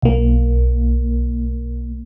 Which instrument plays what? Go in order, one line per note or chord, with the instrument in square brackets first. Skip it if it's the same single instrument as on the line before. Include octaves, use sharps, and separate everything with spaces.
[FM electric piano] B1 A#3